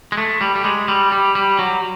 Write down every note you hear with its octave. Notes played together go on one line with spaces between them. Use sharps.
G#3
A3
G3
G3
G#3
G3
G3
G3
F#3